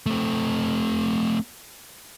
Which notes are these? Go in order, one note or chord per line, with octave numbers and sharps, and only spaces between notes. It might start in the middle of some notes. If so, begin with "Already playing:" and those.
A3 C4